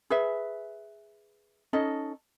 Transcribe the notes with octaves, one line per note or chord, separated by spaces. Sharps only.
G#4 B4 E5
C#4 D#4 A4 D#5